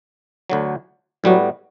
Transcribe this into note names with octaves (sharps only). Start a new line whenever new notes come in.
D2 D3 F#3
A2 F#3 G3 B3 F#4